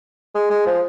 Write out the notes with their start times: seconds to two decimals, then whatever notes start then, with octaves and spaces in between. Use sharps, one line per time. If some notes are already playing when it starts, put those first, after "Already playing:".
0.35 G#3
0.50 G#3
0.66 F3